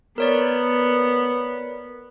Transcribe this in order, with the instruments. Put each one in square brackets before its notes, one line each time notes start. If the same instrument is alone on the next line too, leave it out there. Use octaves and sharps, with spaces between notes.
[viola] B3 [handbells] A#4 C#5 D5